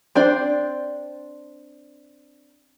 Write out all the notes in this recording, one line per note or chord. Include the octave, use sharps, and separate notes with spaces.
C4 D4 C5 D5